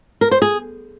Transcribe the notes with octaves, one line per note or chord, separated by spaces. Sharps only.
A#4
C5
G#4